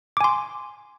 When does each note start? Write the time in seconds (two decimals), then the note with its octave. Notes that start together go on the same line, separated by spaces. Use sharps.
0.17 D6
0.21 G#5
0.24 C6